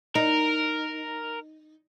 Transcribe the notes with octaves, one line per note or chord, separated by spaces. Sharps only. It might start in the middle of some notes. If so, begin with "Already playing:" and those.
D#4 A#4